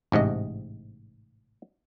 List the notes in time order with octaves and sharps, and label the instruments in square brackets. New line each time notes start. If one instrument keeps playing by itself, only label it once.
[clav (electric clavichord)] A1 G#2 C3 D#5